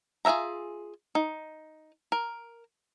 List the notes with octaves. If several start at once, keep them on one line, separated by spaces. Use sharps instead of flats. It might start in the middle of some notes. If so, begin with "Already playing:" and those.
F4 G#4 A#4 E5 A#5
D#4
A#4